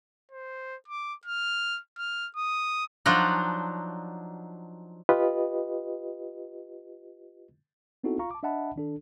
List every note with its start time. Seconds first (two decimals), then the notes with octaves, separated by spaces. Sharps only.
0.32 C5
0.88 D6
1.26 F6
1.98 F6
2.37 D#6
3.06 F3 F#3 D4 D#4
5.09 F4 G4 B4 D#5
8.04 B3 C4 D#4 E4 F#4 A4
8.19 F4 F5 A#5 C#6
8.31 A5 D6
8.43 D4 D#5 E5 F#5 A5 B5
8.76 D#3 D4 A4